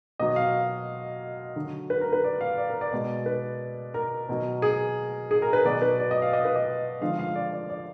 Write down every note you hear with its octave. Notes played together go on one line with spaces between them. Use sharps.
B2 F#3 D#5
F5
D3 F#3
B4
A#4
B4
D5
F5
D5
A#4
D5
B2 G#3
B4
A#4
B2 F#3
G#4
G#4
A#4
B4
B2 F#3 D5
B4
D5
D#5
F5
D#5
B4
D#5
D3 F3 G#3 F5
F5
D5
D5
D5